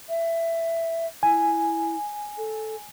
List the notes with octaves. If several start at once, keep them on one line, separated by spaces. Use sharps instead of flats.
E5
E4 G#5
A4